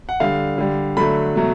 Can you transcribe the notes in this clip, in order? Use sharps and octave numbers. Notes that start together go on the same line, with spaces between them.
F#5
D3 G3 F5
D3 G3
D3 F#3 A3 B5
B2 F#3 A3